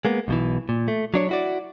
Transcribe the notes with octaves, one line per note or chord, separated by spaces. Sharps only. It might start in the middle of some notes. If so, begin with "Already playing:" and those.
G#3 A#3 B3
B1 B2 E3
A#2
A3
F#3 D4 C#5
E4 F#4 D5